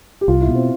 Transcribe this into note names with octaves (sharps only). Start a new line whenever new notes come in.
G4
C2 F4
E4
B2
C4